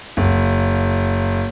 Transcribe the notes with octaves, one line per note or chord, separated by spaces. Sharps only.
F#1